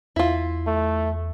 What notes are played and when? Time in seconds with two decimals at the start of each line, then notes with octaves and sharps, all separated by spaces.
0.16 E2 E4 F4
0.67 A3